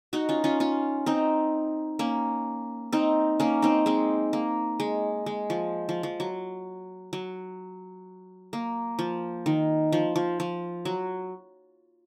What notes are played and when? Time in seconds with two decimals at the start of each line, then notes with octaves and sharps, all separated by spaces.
0.13 D#4 F#4
0.29 C#4 F4
0.44 C#4 F4
0.60 C#4 F4
1.06 C4 D#4
1.99 A#3 C#4
2.92 C4 D#4
3.40 A#3 C#4
3.62 C4 D#4
3.86 G#3 C4
4.33 A#3
4.80 G#3
5.26 G#3
5.50 F3
5.89 F3
6.03 F3
6.20 F#3
7.13 F#3
8.53 A#3
8.99 F3
9.46 D#3
9.92 F3
10.16 F3
10.40 F3
10.85 F#3